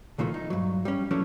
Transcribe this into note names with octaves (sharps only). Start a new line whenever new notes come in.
C#2 A#2 D#3 F3 A3
D#4
G2 F#3
G3 C#4
E3 F#3 A3 C#4 D4